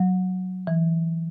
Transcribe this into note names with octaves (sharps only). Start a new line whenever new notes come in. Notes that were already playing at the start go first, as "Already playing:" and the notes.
Already playing: F#3
E3